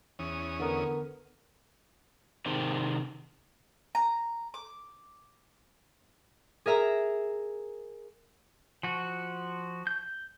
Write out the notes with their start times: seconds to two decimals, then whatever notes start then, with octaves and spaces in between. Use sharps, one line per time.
0.19 E2 C#4 D#6
0.59 D3 B3 A#4
2.46 C3 D#3 C4
3.95 A#5
4.54 D6
6.66 G#4 A#4 E5 A#5
8.83 F3 F#4
9.87 G6